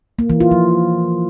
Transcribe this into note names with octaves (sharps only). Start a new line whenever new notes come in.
A#3
E3
F4
F3